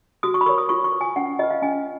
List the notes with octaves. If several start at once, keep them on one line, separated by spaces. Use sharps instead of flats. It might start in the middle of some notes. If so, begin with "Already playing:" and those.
F#4 D#6
C#6
B5
A#4 C#5 C#6
D#6
F4 C#6
C#6
B4
G#5
C#4 F#5
F4 B4 D#5
F5
C#4 G#5